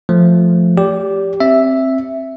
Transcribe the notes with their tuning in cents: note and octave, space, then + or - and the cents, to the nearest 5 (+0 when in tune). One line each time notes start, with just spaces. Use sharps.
F3 +0 A3 +0
G4 +0 D5 -35
C4 +15 E5 +0